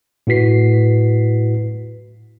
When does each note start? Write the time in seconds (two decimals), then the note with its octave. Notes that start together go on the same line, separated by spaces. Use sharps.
0.27 A2 E4 F#4 B4 B6 C7